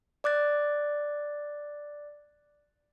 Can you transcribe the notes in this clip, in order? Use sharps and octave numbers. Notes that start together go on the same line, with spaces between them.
D5 D6 F#6 A6